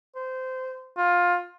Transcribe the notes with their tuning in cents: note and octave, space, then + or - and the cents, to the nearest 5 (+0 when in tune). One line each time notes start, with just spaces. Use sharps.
C5 -20
F4 +15